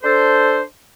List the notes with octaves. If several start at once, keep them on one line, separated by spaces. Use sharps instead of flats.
D4 A4 C5